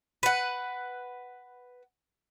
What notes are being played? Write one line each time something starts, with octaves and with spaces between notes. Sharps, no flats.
B4 F#5